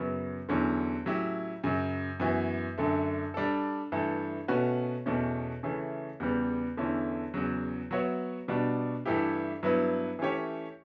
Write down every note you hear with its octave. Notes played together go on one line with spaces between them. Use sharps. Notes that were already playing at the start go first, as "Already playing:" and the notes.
Already playing: F#2 C#3 F#3 B3
E2 D3 F#3 C#4 E4
A2 F#3 C#4 E4 G4
F#2 C#3 F#3
F#2 E3 B3 F#4
F#2 D3 A3
G3 D4 A4
G2 E3 A3
B2 A3 C#4 F#4 B4
E2 B2 A3 C#4
C#3 E3 A3 C#4
E2 C#3 G3 B3
E2 D3 A3 C#4 E4
E2 C#3 F#3
F#3 B3 F#4 C#5 E5
B2 G3 D4 F#4
G2 E3 A3 E4 G4
G2 F#3 B3 E4 B4
E3 A3 C#4 G4 C#5